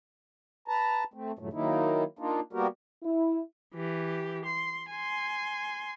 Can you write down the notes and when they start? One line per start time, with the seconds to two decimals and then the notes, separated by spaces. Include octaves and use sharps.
0.68 B4 A5 A#5
1.14 A3 C4
1.39 G2 A#2 C#3 E3 F#3 A3
1.53 D#3 F#3 A#3 D#4 E4
2.19 A#3 D4 D#4 F4
2.53 G3 A#3 B3 F#4 G4 A#4
3.03 E4
3.74 E3 G4
4.45 C6
4.90 G#5 C6